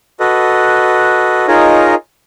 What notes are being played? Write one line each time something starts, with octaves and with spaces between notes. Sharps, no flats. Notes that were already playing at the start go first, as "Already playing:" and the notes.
F#4 A4 B4 D#5
D#4 F4 G#4 A#4 C#5 D#5